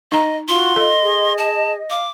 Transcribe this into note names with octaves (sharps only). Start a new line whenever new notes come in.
D#4 D#5 A#5
F4 F#4 C6
A4 D#5
G#4
A5
F5 D6